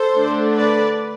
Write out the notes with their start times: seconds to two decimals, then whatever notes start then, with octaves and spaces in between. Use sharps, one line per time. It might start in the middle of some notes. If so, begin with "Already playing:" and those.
Already playing: A4 C5
0.16 D3 A3 D4
0.56 B4 D5